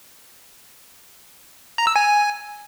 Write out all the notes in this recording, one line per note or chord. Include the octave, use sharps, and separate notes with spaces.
A#5
E6
G#5